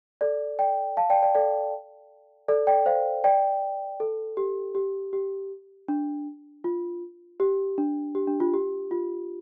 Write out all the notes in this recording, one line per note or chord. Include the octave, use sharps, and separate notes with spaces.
A4 D5
D5 G5
F5 A5
D5 G5
D5 G5
A4 D5
A4 D5
D5 G5
C5 F5
D5 G5
A4
G4
G4
G4
D4
F4
G4
D4
G4
D4
F4
G4
F4